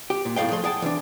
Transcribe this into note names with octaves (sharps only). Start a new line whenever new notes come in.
G4
A#2
B1 E2 A2 F5 G5
F3 A3 C6
G#4 F#5 G5 A5
E3 D4